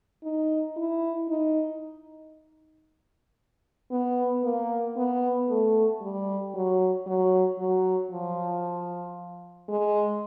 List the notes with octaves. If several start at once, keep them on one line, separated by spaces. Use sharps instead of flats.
D#4
E4
D#4
B3
A#3
B3
A3
G3
F#3
F#3
F#3
F3
G#3